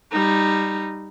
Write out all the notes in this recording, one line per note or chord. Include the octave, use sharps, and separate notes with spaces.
G3 D#4